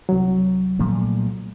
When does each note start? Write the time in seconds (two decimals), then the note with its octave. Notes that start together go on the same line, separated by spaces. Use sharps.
0.09 C2 F#3
0.79 A#2 F3 A3